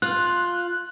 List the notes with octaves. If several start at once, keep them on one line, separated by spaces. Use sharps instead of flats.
F4 F#6